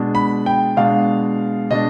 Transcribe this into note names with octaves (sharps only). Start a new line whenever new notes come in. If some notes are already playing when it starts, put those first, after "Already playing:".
Already playing: B2 G#3 D4
B5
G5
B2 G#3 D4 F5
B2 G#3 D4 D#5